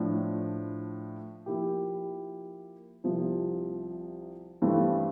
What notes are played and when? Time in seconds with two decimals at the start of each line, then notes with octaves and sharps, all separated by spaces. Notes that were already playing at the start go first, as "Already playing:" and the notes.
Already playing: A2 F3 A3 D4
1.46 F3 A#3 E4 G4
3.04 C2 C3 F3
4.62 G2 E3 A3 C4 E4